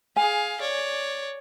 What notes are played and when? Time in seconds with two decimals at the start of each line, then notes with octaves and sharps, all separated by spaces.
0.16 G#4 F5 G#5
0.61 C#5 D5